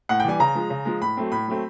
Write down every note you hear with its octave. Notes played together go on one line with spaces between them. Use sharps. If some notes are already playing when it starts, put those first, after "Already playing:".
A2 F#5
G5
E3 G3 G#5
C#3 A#5
F3 G#3
C#3
F3 G#3
A2 B5
F#3 A3 C4
A2 B5
F#3 A3 C4